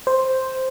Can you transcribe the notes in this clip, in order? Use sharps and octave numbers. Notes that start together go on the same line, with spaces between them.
C5